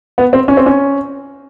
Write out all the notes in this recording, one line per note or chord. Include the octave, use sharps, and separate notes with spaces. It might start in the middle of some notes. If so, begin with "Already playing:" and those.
B3
C4
C#4
C4
C#4